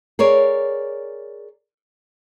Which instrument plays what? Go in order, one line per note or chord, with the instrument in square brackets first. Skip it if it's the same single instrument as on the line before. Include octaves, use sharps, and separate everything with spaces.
[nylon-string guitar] G#4 A#4 C#5 D5